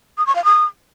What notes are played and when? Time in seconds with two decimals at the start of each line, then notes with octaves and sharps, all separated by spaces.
0.18 D#6
0.27 C#6
0.36 F5
0.44 D#6